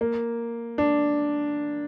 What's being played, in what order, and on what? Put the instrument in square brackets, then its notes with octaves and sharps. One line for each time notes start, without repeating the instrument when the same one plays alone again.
[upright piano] A#3
D4